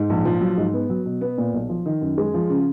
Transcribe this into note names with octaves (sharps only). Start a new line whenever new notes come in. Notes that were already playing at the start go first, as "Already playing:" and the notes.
Already playing: G#2
A#1
F3
F#3
G#2
B3
F#3
B2
B3
A#2
B1
F3
D#3
F#2
G#3
F3
C#3